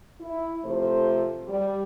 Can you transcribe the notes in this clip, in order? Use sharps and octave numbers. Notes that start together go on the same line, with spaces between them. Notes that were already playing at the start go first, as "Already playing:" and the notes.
E4
C3 F3 A3 A4 C5
G3